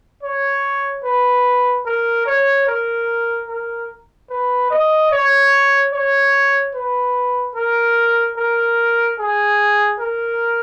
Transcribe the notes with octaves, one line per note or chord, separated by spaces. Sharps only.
C#5
B4
A#4
C#5
A#4
A#4
B4
D#5
C#5
C#5
B4
A#4
A#4
G#4
A#4